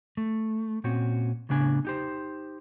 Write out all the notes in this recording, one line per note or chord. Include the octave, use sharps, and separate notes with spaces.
A3
A#2 C4 C#4 F#4
A2 C#3 B3 D4 G#5
D#4 G4 C5